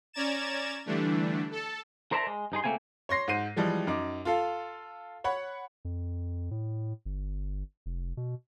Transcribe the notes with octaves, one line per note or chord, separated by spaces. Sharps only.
C#4 D5 A#5 G#6 A6 E7
D3 E3 G3 A3 D4
A4 A5
A#4 C5 D5 E5 A5 A#5
G#3
G2 D#4 G#4 C6
C#2 A3 A#3 C4 G#5
C#5 C6 A#6 C7
G#2 C5 C7 D#7
E3 F3 G3 G#3
F#2 D#4 D6
F4 A4 F5
C#5 F#5 B5
F2
A2
G1
F1
B2